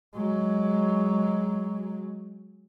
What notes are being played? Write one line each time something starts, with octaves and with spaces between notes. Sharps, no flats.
F#3 G#3